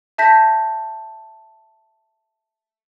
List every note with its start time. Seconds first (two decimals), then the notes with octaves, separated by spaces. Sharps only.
0.18 E5 A5 G6 A#6 B6